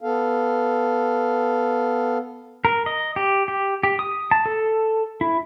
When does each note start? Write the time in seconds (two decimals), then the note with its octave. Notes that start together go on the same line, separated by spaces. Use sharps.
0.01 B3 A4 F5
2.65 A#4
2.86 D#5
3.16 G4
3.48 G4
3.83 G4
3.99 D#6
4.31 A5
4.46 A4
5.21 E4